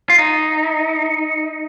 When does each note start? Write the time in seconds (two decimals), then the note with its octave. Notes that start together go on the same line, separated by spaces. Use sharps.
0.10 F4
0.19 D#4